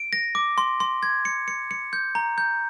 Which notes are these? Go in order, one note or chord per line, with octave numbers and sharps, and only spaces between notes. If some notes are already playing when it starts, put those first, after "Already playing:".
Already playing: D7
A#6
D6
C6
C6
G#6
C#7
C#7
C#7
G6
A#5
G6